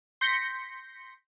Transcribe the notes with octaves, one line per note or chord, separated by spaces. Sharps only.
C6 G6 A#6 B6 C#7